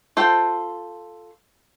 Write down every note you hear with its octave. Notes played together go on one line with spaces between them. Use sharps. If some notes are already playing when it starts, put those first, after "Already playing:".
F4 A4 C5 G5